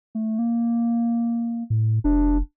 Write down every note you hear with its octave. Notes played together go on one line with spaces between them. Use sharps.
A3
A#3
A2
F1 D4